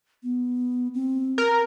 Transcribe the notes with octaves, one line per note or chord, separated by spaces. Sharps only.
B3
C4
A#4